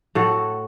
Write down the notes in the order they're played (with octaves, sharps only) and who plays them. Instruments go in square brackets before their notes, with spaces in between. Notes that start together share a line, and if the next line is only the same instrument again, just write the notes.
[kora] A2 F#4 A4